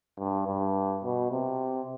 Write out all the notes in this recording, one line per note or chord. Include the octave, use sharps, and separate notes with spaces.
G2
G2
B2
C3